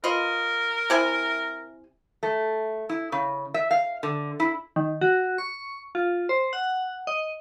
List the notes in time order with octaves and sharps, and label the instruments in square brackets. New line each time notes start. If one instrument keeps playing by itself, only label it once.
[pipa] F4 B4 D#5 [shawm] A#4
[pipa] C3 E4 G#5
[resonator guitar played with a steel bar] A3
E4
C#3
E5
F5
D3
E4
[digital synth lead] D#3
F#4
C#6
F4
C5
F#5
D#5